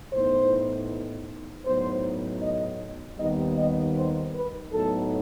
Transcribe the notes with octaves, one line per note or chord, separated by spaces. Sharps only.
A2 E3 B3 D#4 C5
A2 F#3 B3 D#4 C5
D#5
D#2 D#3 G3 B3 D#4 D#5
D#5
C5
B4
A2 F#3 B3 D#4 A4